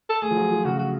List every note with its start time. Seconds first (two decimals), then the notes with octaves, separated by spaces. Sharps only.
0.10 A4
0.22 A3 G#4
0.31 F3
0.36 F#3
0.51 F3
0.65 C#3 F#4
0.79 F#4